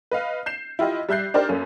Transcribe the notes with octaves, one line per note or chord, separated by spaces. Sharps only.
B4 D#5 F5
G6 C7 E7
E4 F4 G4 D#5
G3 E5 F#6 G6 C7
D4 D#4 G4 A#4 C5 D5
F#2 A#3 C#4 A4